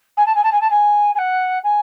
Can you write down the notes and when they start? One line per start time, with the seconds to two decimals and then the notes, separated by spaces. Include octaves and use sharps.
0.17 G#5
0.26 A5
0.35 G#5
0.43 A5
0.52 G#5
0.61 A5
0.70 G#5
1.15 G#5
1.18 F#5
1.63 G#5